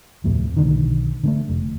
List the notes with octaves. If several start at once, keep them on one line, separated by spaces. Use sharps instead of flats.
D1 F2 A2 C3
B1 D3 D#3
D3 G#3 A3
F1